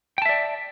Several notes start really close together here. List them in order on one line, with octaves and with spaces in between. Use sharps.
G5 A5 E5 D5